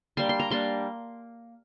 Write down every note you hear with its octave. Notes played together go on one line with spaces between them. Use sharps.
G3 A#3 D4 C6
C6
A#5
G3 A#3 D4 C6